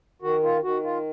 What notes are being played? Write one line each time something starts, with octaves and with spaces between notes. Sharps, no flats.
D#3 F#4
F4
D#3 F#4
F4